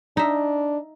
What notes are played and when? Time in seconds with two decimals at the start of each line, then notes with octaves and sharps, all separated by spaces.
0.17 D4 D#4 E5